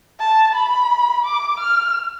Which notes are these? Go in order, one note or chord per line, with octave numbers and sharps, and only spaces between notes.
A5
B5
D6
F6